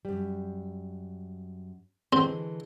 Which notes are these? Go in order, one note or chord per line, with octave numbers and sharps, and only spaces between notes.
F#2 G3
D3 E3 G#3 C4